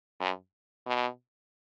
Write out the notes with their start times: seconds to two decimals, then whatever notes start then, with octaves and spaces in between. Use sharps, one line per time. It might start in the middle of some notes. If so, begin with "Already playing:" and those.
0.21 F#2
0.87 B2